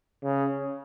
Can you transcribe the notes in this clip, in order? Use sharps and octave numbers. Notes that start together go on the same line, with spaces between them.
C#3